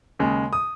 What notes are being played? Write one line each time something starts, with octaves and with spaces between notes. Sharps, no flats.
D#2 C#3 G#3
D#6